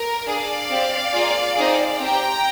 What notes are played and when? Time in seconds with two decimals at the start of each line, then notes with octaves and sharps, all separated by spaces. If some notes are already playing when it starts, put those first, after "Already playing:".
Already playing: A#4
0.26 D4 G#4 D5 F5
0.69 C4 G4
1.13 A#3 F4 G#4
1.56 C4 D#4 G#4
1.99 C4 G4 G5 A#5